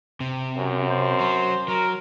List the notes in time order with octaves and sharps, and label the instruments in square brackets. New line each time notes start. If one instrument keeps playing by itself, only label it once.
[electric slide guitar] C3
[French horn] F#2
[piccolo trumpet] C5
[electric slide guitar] F#3
[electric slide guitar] F#3 [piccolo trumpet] A#4